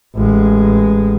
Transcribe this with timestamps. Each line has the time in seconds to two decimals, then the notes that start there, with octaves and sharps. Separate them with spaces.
0.15 A1 G#3